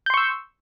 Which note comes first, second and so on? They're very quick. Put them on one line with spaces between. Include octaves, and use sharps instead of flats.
G6 C6 C#6 E6